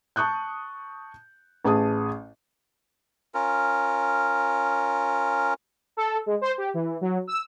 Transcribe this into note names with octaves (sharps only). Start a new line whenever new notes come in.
A5 C#6 D#6 F#6 G6
A1 G#4 A5 D#6
C#4 F4 A#4
A4
G#3
C5
G4
E3
F#3
E6